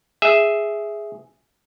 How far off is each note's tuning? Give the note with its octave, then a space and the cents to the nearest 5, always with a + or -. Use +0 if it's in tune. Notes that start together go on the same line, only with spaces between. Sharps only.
G#4 +0 E5 +0